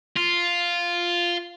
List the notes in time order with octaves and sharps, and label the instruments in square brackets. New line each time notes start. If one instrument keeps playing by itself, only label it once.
[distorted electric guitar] F4